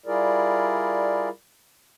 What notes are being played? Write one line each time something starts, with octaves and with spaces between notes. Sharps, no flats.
G3 E4 F4 G#4 A#4 D5